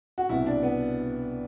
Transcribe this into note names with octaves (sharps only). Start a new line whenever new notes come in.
F#4
C2 B2 E4
D4
B3